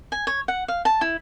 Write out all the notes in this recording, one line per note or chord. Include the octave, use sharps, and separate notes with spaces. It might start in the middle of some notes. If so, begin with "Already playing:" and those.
G#5
C#5
F#5
F5
A5
E4